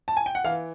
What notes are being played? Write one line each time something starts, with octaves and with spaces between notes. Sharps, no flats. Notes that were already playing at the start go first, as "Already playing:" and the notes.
A5
G#5
G5
F#5
E3 F5